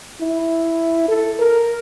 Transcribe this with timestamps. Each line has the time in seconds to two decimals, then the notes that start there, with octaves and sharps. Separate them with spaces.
0.21 E4
1.08 A4
1.39 A#4